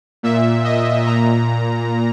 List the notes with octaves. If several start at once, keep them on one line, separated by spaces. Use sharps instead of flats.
A#2 E5
D#5
A#2 A#5